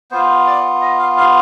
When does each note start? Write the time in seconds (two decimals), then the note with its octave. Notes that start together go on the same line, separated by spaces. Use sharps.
0.11 B3 F4 C5
0.47 D5
0.82 D#5
0.99 F5
1.17 F5